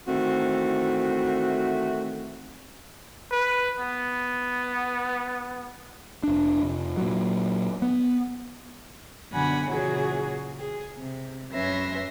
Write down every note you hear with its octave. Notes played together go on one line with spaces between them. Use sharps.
D#3 E3 A3 C4 F#4
B4
B3
F1 D4
F1
A#2 F#3
B3
F#2 B2 D3 F#5 G#5 B5
A#2 C#3 E3 F#3 F#4 G#4
G#4
C3
F#2 C#4 B4 E5 C6 A#6